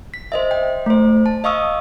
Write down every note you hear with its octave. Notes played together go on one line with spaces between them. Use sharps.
B6
C5 D#5 E5
G5
A3 C5
A5
D#5 F5 C#6 D#6 E6